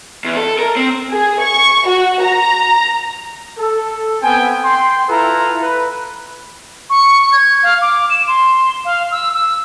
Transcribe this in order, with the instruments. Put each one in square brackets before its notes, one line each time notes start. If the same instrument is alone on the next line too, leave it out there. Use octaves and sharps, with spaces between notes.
[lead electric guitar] E2
A4
A#4
C4
[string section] G#4
C#6
F#4
A#5
[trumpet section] A4
B3 C4 G5 G#5
G5 C6
E4 F4 A4 B4 A#5
B4
[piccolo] C#6
G#6
F5
D6
E7
C6
F5
E6
E6